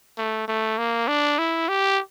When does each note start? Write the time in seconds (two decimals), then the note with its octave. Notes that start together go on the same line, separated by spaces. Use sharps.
0.18 A3
0.48 A3
0.78 A#3
1.08 D4
1.39 E4
1.69 G4